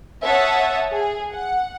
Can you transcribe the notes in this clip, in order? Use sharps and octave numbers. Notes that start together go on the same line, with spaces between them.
C#5 E5 F#5 A5 D#6
G#4
F#5